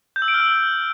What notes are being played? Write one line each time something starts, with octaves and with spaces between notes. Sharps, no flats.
G6
E6
D7
F6
E6